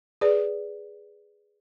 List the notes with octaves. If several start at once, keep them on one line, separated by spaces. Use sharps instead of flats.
G#4 B4 D5